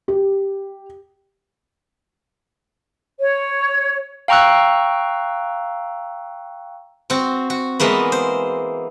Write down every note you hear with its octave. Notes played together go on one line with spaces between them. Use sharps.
G4
C#5
F5 G5 A#5 C#6 E6 F#6
C4 F#4
F#4
E3 G#3 A#3 B3
C5